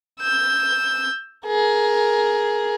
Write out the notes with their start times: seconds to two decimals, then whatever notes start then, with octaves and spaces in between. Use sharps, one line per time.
0.21 E6 G6
1.46 G#4 A#4